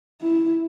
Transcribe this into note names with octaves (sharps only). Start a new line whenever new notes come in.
E4